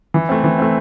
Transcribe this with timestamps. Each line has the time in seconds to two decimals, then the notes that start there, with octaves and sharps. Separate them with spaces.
0.14 E3
0.29 A3 C4
0.44 E3
0.59 A3 C4